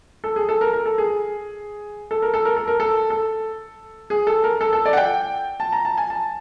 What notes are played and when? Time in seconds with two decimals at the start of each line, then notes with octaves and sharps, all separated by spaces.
0.24 A4
0.36 G#4
0.49 A4
0.61 A#4
0.73 A#4
0.86 A4
0.98 G#4
2.11 A4
2.22 A#4
2.34 A4
2.45 A#4
2.57 A4
2.68 A#4
2.80 A4
3.10 A4
4.10 G#4
4.27 A4
4.44 A#4
4.61 A4
4.73 A4
4.86 D5
4.93 F#5
4.97 G5
5.60 A5
5.73 A#5
5.85 A5
5.98 G#5
6.10 A5